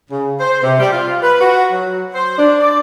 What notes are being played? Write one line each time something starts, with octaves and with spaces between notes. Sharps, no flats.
C#3
C5
C3
G3
F4
B4
F#4
F#3
C5
D4
D5